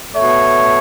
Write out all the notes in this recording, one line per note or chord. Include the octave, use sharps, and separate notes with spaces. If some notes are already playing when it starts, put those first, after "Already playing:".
B2 A3 C#5